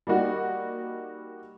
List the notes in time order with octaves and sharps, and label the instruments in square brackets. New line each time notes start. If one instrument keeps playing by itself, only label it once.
[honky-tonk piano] G3 A#3 D#4 F#4